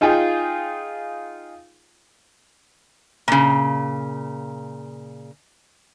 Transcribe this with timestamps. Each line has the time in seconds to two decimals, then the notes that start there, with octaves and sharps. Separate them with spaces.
0.01 D#4 F4 G#4 F5 G5
3.28 A#2 C#3